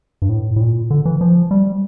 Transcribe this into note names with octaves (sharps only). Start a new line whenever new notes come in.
G2
A2
A2
A#2
D3
E3
F3
G3